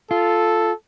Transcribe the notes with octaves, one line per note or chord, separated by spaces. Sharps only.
F4 A4